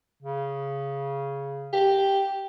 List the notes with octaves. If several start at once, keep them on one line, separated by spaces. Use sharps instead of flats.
C#3
G4